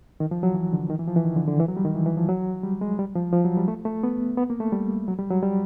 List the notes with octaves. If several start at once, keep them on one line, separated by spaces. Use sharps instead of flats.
D#3
F3
F#3
E3
D3
D#3
E3
F3
E3
D#3
D3
D3
E3
F#3
G3
D#3
E3
E3
F3
F#3
G3
G#3
G3
F3
F3
F#3
G3
A3
A3
B3
B3
A#3
A3
G3
F#3
G3
F#3
G3